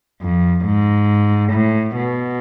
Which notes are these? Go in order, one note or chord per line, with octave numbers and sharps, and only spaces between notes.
F2
G#2
A2
B2